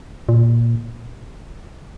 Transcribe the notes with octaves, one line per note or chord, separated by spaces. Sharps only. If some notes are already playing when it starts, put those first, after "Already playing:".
A#2